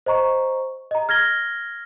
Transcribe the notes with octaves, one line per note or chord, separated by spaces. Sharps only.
C5 D#5 A#5 C#6
D#5 A#5
F6 G#6 A#6 G7